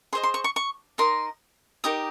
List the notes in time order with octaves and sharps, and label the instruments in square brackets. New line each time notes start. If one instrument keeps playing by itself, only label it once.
[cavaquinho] G#4 C5 D#5 C6
C6
C#6
C#6
C#6
D#4 A#4 D#5 C6
D#4 G4 A#4 D#6